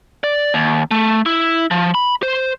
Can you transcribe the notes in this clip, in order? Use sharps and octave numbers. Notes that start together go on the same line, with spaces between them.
D5
D#2
A3
E4
F3
B5
C5